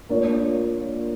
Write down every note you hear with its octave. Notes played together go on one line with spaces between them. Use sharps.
A#3 D4 F4 C#5